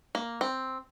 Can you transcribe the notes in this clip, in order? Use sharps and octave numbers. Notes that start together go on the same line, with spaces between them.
A#3
C4